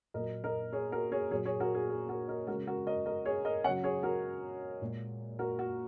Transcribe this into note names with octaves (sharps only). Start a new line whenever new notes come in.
A#2 F#3 A#4 D#5
A#4 D#5
G#4 C#5
F#4 A#4
G#4 C#5
A#2 F#3 G#4 C#5
G#4 C#5
F#4 A#4
G#4
G#4
F#4 A#4
A#4 D#5
C#3 G#3 F#4 A#4
F#4 A#4
A#4 D#5
A#4 D#5
G#4 C#5
A#4 D#5
C#3 F#3 C#5 F#5
G#4 C#5
F#4 A#4
A#2 G#3
F#4 A#4
F#4